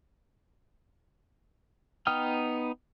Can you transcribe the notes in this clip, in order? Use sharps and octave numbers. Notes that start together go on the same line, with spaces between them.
B3 D#4 G5 D#6 F6